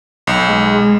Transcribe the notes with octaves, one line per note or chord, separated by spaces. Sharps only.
B1
G#3